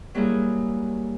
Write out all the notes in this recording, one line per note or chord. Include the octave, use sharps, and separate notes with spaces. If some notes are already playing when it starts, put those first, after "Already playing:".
F#3 G3 A#3 E4 G#4